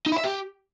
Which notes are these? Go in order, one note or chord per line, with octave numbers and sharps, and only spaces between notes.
D#4
E4
E5
G4